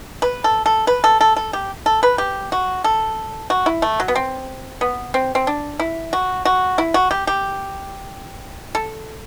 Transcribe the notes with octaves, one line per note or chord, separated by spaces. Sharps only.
B4
A4
A4
B4
A4
A4
A4
G4
A4
B4
G4
F#4
A4
F#4
E4
A3
F#3
B3
C4
B3
C4
C4
D4
E4
F#4
F#4
E4
F#4
G4
G4
A4